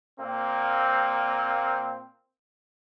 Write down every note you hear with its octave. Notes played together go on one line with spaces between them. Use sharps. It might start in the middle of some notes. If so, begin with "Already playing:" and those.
A#2 A#3 C4